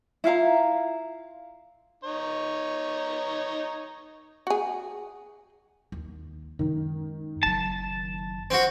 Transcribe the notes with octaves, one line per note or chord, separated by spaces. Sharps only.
E4 F4 F5 A#5
D#4 C#5
F#4 G#4
D#2
F#2 D#3 G#3
F#1 F#3 A5
C4 F#4